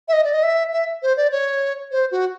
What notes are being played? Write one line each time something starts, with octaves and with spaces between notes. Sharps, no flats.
E5
D#5
D5
D#5
E5
E5
C5
D5
C#5
C5
F#4